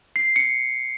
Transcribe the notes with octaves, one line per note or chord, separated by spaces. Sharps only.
C7
C#7